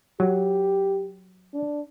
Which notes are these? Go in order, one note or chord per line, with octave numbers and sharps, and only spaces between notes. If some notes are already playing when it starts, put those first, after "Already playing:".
F#3 G4
D4